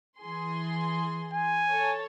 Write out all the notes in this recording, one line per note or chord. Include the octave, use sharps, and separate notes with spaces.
E3 G#4 C6
G#5
A4 C#5 A5